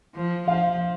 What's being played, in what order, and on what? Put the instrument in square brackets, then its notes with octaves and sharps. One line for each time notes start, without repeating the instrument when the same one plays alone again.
[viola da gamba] F3
[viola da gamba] F3 [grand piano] F5